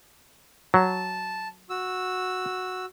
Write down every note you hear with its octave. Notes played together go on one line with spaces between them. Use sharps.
F#3 A5
F#4 E6